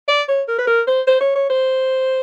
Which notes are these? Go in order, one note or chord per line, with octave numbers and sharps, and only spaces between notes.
D5
C#5
A#4
B4
A#4
C5
C5
C#5
C#5
C5